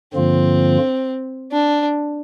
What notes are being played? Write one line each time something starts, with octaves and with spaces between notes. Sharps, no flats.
G2 D3 F3 A#3 C4 F4
D4